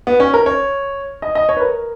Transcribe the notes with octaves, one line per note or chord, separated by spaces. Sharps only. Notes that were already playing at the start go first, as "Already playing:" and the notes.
B3
C#4
A#4
C#5
D#5
D#5
C#5
B4
A#4